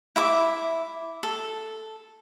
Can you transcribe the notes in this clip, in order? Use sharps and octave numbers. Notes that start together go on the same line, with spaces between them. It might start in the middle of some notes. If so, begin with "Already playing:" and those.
E4 E5 D6
A4